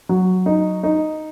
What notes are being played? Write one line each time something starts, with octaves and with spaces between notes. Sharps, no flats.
F#3
D#4
D#4